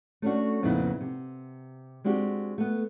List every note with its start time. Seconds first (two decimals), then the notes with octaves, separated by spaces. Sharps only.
0.22 A3 C#4 D4 F#4
0.63 F2 A#2 C#3 B3 E4
1.01 C3
2.04 G#3 C4 D4 F#4 G4
2.58 A3 B3